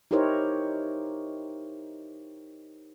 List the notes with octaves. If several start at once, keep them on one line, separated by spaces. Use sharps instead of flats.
D#4 E4 G4 A#4 C5 C#5